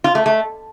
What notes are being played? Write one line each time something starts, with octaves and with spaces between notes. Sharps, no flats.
F4
A3
A3